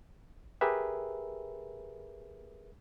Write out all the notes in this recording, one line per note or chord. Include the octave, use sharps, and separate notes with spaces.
G4 G#4 A#4 B4 E5